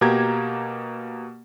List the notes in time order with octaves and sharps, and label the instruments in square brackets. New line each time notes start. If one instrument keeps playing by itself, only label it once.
[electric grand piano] B2 A#3 G4 A#5 G#6